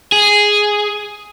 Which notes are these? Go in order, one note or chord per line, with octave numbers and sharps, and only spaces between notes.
G#4